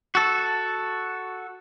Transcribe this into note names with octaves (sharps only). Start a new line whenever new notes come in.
F#4 A4